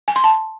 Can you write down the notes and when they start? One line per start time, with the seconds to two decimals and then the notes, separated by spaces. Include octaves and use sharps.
0.08 G#5
0.16 C6
0.24 A5